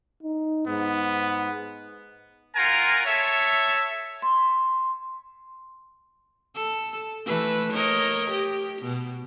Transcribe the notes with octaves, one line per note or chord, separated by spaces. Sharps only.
D#4
G#2 B3
F4 A#4 F#5 G#5 A#5
A4 C#5 E5
C6
A4
E3 A3 B4
A#4 C#5 D#5
G4
B2